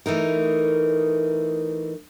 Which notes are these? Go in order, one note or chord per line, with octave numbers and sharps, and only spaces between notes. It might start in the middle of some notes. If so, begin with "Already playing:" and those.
E3 A3 D#4 A#4